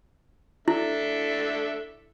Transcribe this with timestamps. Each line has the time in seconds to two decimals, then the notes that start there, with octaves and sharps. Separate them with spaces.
0.68 D4 E4 A4 E5